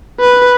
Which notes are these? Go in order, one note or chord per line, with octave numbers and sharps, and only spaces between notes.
B4